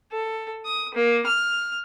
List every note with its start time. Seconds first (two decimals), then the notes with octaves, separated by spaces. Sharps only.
0.12 A4
0.65 D#6
0.95 A#3
1.27 F6